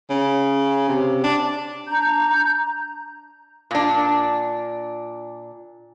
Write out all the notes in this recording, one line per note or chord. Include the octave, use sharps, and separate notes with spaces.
C#3
C3
D4
D4 A#5 G6
A#2 D4